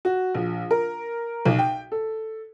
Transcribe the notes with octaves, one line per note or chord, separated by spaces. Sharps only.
F#4
A#1
A#4
B1
G5
A4